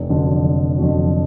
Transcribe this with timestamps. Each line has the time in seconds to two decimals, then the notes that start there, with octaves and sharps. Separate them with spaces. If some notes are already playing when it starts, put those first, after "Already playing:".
Already playing: F1
0.09 F2 D3 F#3
0.43 F1
0.78 F2 D3 F#3